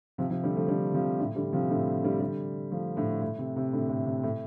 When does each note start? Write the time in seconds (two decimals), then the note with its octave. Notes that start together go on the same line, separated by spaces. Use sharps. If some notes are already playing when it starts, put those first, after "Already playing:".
0.18 C3 F3
0.30 C3 F3
0.43 D3 G3
0.56 F3 A3
0.68 D3 G3
0.94 C3 F3
1.20 A2 D3
1.36 D3 G3
1.53 C3 F3
1.70 A2 D3
2.04 D3 G3
2.20 D3 G3
2.71 F3 A3
2.97 A2 D3
3.22 A2
3.39 C3
3.56 C3
3.73 A2 D3
3.89 A2
4.06 C3
4.23 A2